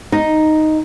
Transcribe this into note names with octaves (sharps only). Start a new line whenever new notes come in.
D#4